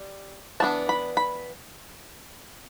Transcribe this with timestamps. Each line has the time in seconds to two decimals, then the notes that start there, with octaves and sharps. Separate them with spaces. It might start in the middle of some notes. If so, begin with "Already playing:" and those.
Already playing: G3
0.60 E3 B3 D4 A5
0.89 B5
1.17 B5